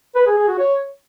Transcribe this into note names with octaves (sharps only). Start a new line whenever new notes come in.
B4
G#4
G#4
F#4
C#5